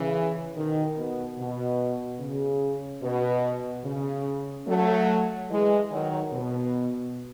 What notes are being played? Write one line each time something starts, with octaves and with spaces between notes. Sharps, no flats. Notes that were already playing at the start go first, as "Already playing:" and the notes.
Already playing: C#3 E3
B2 D#3
B2
B2
C#3
B2
C#3
F#3 A3
E3 G#3
D#3 F#3
B2